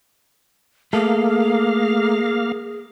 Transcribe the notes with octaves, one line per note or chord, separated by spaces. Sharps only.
A3 A#3 G#4 A4 F5